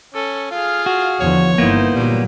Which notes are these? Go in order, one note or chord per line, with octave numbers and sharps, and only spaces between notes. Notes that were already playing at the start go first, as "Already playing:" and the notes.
C#4 A4
F4 G#4 F5
F#4
E2 D3 F3 C#5
G1 E3 A#3 B3 D#4 C5
G1 A#2 F#3 G3